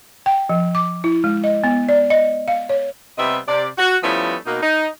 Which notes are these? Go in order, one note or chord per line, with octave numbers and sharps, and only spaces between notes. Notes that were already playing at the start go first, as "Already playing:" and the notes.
G5
F3
D6
E4
G#3
D#5
B3
D5
D#5
F5
C#5
C3 G3 B3 C4 D#5 E5
C3 D5
F#4
F3 G3 A3 B3 C#4 E4
B2 A#3 D#4
D#4